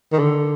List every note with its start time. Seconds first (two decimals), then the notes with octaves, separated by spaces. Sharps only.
0.12 D#3
0.19 D3